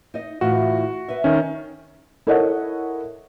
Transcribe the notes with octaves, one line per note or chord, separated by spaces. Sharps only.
D#4 D#5
A2 E3 F4 F#4
B4 E5
D#3 C#4
E4 A4 A#4 C#5 D#5 F#5